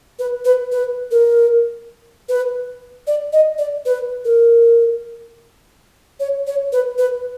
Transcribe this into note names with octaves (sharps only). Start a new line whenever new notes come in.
B4
B4
B4
A#4
B4
D5
D#5
D5
B4
A#4
C#5
C#5
B4
B4